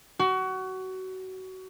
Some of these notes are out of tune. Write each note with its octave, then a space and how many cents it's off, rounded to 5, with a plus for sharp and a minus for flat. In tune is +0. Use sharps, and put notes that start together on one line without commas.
F#4 +25